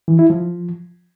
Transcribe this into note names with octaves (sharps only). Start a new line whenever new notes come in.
E3
E4
F3